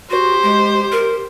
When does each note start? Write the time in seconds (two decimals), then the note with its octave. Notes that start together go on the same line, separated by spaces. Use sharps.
0.10 F#4 G4 C5
0.43 G#3
0.92 A#4